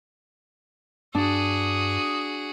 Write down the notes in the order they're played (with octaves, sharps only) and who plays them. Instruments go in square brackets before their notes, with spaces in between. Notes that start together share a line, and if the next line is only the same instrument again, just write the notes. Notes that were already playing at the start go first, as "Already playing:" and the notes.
[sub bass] G2 [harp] D4 [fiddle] F#4 G#4 [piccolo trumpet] D#6